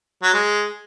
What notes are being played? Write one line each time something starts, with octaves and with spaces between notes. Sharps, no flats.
F#3
G#3